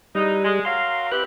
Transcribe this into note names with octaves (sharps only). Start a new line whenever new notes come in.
E3 G3 G#3 D#4
G#3
F#3 A#4 F5 C6
C4 E4 G4 B4 F#6